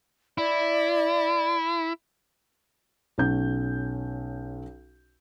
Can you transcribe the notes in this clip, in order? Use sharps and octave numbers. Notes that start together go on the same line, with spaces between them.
E4 D5
B1 C#4 G6